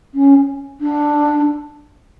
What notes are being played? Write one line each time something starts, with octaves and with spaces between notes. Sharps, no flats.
C#4
D4